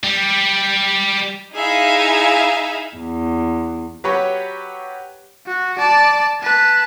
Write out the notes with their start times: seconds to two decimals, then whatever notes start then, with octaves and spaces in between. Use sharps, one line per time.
0.04 G3
1.55 D#4 E4 G#4 E5 F5
2.96 E2
4.04 F#3 G4 B4 C#5
5.46 F#4
5.78 D5 A5
6.41 B4 A5